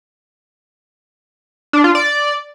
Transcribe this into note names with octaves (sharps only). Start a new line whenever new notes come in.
D4
F4
D5